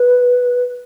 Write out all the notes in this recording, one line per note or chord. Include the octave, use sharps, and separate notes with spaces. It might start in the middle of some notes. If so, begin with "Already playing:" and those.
Already playing: B4